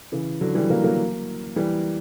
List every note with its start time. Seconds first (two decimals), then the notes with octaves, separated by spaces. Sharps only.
0.12 C#3 E3
0.41 D3 F#3
0.55 E3 G3
0.70 F#3 A#3
0.84 F#3 A#3
1.56 E3 G3